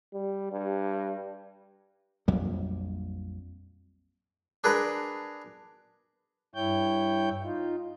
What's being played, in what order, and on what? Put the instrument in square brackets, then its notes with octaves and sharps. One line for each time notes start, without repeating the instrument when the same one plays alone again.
[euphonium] G3
G2
[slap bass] A#1 F2 F#3 G3
[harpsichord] D4 G#4 A#4 B4
[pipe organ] G2 E4 C#5 G5 G6
D#4 F4